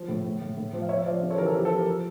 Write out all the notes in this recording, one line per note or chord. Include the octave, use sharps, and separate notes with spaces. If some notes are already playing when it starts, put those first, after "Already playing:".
Already playing: F3
A2
A2
A2
A2
F3
F5
F3 C#5 E5
F3 D5 F5
C#3
A4 C#5
E3 G4 A#4
A4
F3 G4
A4
F3
G4 A#4
F3